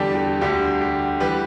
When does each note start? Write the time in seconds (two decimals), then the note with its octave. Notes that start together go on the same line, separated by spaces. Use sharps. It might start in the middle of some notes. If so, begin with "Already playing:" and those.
Already playing: E2 D3 G3 G4 A4 D5
0.15 G4
0.41 D2 D3 G3 G4
0.81 G4
1.20 E3 G3 G4 B4